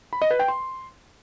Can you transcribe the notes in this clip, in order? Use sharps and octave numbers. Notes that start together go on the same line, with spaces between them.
B5
D#5
B4
G5
C6